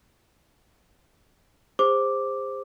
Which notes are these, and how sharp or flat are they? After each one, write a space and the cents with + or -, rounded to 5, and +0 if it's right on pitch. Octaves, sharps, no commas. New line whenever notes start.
G#4 -45 C5 +0 D6 +0